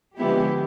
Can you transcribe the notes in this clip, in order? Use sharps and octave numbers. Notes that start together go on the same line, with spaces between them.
D3 F3 G#3 B3 E4 G4